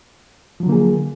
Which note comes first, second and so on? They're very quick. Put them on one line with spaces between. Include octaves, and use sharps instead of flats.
F3 F#3 D3 A#3 G#4